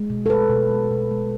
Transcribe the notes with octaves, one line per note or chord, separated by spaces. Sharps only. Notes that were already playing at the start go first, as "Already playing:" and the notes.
Already playing: G#3
B2
A4
G#3 B4
B2
G#3
B2
G#3